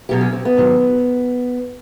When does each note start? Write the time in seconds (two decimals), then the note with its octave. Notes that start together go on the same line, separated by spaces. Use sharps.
0.09 E2 B2 F#3 G4
0.21 C#4
0.33 C4
0.45 B3
0.57 G#2 D#3 F#3